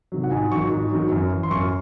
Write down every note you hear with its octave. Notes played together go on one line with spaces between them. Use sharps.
C3 D#3 F#3
F#5
G#2 G#5
D#3 F#3 C#6
G#2
D#3 F#3
F#2
E3
C6
F#2 C#6